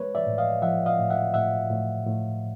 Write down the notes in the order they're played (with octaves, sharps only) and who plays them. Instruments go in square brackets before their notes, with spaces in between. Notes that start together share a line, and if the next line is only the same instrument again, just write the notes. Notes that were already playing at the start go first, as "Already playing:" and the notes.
Already playing: [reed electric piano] G#3 B4 C#5
D5 E5
A2
D#5 F5
F3 E5 F#5
D#5 F5
A2
E5 F#5
A2 E5 F#5
A2
A2